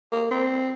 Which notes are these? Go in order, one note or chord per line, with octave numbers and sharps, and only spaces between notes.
A#3
C4